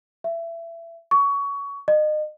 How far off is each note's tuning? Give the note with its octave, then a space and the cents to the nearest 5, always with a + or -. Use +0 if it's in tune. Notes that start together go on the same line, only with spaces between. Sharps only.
E5 +25
C#6 +20
D#5 -30